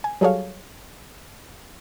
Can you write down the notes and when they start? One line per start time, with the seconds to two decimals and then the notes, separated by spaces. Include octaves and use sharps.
0.04 G#5
0.21 F#3 G3 G#4 A4 C#5 F5